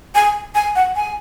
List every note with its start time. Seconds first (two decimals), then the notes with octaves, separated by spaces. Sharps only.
0.15 G#5
0.55 G#5
0.76 F#5
0.96 G#5